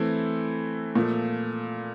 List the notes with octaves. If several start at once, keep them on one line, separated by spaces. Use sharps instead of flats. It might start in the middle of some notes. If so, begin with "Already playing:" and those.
Already playing: E3 A3 C4 E4
A#2 F3 A3